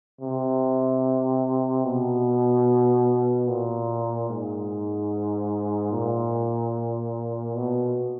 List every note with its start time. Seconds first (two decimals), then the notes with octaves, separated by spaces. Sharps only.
0.21 C3
1.85 B2
3.48 A#2
4.29 G#2
5.92 A#2
7.55 B2